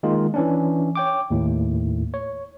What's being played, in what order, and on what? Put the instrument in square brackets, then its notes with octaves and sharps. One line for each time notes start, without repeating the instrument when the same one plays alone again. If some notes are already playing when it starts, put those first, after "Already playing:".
[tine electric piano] D#3 G#3 A#3 F4
E3 C#4 D4
C#5 G5 D6
D#2 A2
C#5